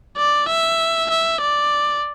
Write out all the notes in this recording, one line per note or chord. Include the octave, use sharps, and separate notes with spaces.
D5
E5
E5
D5